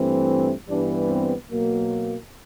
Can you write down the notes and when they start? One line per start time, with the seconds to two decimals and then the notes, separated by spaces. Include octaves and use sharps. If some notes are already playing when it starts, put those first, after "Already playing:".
Already playing: G2 E3 A3 C4
0.68 G2 E3 G3 B3 D4
1.09 C4
1.51 B2 F#3 A#3